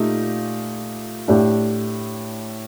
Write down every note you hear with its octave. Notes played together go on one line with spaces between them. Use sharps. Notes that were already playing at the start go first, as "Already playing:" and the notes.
Already playing: A#2 A3 D#4 G4
A2 A3 D4 G4